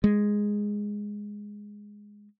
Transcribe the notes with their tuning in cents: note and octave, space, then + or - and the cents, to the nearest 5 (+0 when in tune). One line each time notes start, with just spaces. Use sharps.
G#3 -5